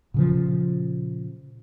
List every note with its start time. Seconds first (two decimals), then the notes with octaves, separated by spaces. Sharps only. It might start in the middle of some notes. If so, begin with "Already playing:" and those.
0.14 A#2 C#3 F3